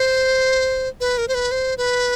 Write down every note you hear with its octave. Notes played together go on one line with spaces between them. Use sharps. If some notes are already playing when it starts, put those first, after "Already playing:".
Already playing: C5
B4
A#4
C5
B4
C5
B4